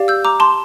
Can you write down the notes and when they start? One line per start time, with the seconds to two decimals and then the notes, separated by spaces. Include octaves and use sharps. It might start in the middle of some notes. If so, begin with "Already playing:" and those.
Already playing: G4 D5 F5
0.08 E6 G6
0.24 A#5 D6
0.40 A5 C6